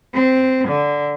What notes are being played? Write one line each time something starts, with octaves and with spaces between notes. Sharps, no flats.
C4
D3